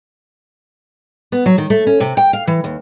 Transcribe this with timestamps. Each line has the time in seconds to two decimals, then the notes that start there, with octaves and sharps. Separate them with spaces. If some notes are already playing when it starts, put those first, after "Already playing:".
1.32 B3
1.46 F#3
1.58 D#3
1.70 A3
1.87 C#4
2.00 C3
2.17 G5
2.33 F5
2.47 E3
2.64 D#2